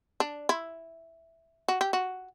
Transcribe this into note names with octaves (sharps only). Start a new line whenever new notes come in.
D4
E4
F#4
G4
F#4